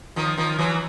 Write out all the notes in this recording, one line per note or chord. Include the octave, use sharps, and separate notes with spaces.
D#3 F3
D#3 F3
E3 F#3